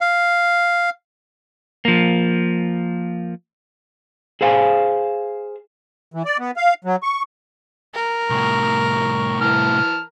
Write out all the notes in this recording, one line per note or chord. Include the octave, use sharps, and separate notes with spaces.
F5
F3 A#3
G#4 C5 F5 G#5
E3
D5
B3
F5
F#3
C#6
A#4
C2 A2 C#6
E3 A5 F6